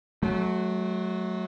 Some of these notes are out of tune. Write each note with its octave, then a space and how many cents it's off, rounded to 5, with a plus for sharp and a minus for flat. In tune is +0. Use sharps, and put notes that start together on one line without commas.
F#3 +0 A3 -35